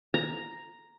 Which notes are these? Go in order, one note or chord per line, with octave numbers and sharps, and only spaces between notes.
A#5